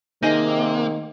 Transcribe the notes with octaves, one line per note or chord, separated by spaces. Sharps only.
C3 D#3 A#3 D#4 G#4 D#5